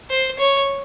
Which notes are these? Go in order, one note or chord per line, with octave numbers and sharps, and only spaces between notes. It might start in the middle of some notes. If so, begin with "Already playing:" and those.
C5
C#5